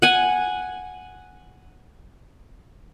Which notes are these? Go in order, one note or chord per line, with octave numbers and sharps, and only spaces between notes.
F#5 G#5